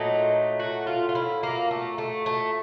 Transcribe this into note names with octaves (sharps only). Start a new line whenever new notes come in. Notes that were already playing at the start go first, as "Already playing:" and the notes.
Already playing: A#2 F#3 A3 D#4
F#4
F4
F4
E4
A#3
A3
A3
A3